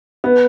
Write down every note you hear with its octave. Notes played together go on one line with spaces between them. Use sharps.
B3